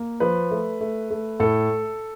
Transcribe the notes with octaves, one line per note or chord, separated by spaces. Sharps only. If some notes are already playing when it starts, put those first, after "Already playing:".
Already playing: A#3
F3 B4
A3
A3
A3
A2 A4